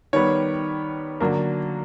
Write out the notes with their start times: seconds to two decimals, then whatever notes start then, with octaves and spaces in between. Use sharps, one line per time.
0.13 D#3 G3 B3 C#5
1.20 D3 F#3 A#3